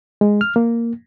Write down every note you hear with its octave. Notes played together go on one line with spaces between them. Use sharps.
G#3
F6
A#3